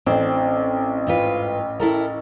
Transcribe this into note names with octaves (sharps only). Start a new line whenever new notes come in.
A1 C4 D4
G#2 F4 B4
E4 A4 A#4